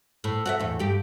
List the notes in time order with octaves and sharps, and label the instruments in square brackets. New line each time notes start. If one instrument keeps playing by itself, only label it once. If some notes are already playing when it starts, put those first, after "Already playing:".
[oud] A2
F#4 D5 E5
E2 A2
G2 G4